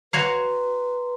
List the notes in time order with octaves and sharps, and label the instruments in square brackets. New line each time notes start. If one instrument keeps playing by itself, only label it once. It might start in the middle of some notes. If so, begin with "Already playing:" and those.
[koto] F#4 C#5 F5 [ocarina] B4 [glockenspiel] A#5 C6